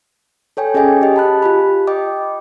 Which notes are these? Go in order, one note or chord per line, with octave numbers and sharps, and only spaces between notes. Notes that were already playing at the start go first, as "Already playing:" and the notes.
A4 C#5 G5 G#5
C#4 G#4 C#5 D#5 G5 G#5
G4 D#5
A5 B5 F#6
F4 G4 B5
D#5 G5 D6